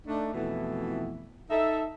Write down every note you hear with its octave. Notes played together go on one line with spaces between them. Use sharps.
A3 D4 D#4
F2 B2 E3 A3 B3 E4
D#4 A4 E5